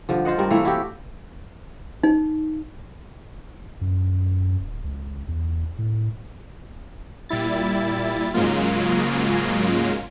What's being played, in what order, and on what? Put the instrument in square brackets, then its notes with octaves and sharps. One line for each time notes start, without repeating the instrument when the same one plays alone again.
[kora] G2 D3 F3
F4 C5 D#5 F#5
G2 C4 A#4
E3 A3 A#3 E4
E4 F#4 G4
[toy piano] D#4
[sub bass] F#2
D1
C#2
E2
A2
[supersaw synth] A#2 G3 E4 A6
G#2 C#3 F#3 G#3 A#3 F4